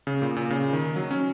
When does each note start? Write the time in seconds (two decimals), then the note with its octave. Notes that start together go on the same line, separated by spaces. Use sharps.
0.07 C#3
0.22 A#2
0.36 A#2
0.50 C#3
0.73 D#3
0.96 F#3
1.11 C#4